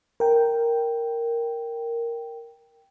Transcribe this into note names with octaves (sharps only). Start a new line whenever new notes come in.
A#4 G5